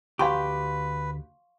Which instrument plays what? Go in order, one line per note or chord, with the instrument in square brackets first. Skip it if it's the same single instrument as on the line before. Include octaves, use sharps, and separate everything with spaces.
[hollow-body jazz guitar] D2 G4 [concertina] B4 [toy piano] F5 C6 C#6